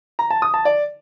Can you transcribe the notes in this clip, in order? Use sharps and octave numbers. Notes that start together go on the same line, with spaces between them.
A#5
A5
D#6
A5
D5